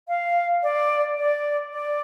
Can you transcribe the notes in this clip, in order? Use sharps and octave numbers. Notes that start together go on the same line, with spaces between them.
F5
D5
D5
D5